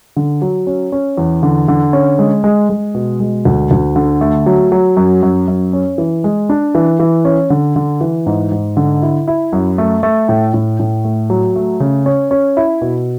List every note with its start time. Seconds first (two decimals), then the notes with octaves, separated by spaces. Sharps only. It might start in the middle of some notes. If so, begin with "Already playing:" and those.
0.16 D3
0.42 F#3
0.67 C#4
0.92 C#4
1.18 E2
1.43 D3
1.68 D3
1.93 C#4
2.19 G#3
2.44 G#3
2.70 G#3
2.95 B2
3.20 G#3
3.45 D2
3.71 D2
3.96 D3
4.21 A3
4.46 F#3
4.72 F#3
4.97 F#2
5.22 F#2
5.48 F#2
5.73 C#4
5.98 E3
6.24 G#3
6.49 D4
6.75 E3
7.00 E3
7.25 C#4
7.50 D3
7.76 D3
8.01 E3
8.26 G#2
8.52 G#2
8.77 D3
9.02 E4
9.28 E4
9.53 F#2
9.78 A3
10.03 A3
10.29 A2
10.54 A2
10.80 A2
11.05 A3
11.30 F#3
11.56 A3
11.80 C#3
12.06 C#4
12.31 C#4
12.57 E4
12.82 B2